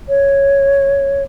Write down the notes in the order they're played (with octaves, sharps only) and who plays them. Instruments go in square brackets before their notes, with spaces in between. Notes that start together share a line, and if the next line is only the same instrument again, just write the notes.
[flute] C#5